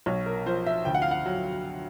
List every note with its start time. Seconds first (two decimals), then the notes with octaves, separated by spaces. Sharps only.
0.06 B1 C#5
0.26 A#4
0.46 F3 C5
0.66 E5
0.85 D2 G5
0.95 F#5
1.02 F5
1.11 F#5
1.26 F#3